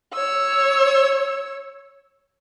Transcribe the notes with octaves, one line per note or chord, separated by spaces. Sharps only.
C#5 E6